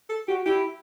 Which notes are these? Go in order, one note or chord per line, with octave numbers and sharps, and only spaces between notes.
A4
F#4 G4
E4 G4